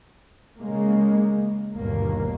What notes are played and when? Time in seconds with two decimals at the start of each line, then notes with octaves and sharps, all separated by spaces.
0.58 C#3 G#3 A#3
1.75 G1 D#2 B2 A#3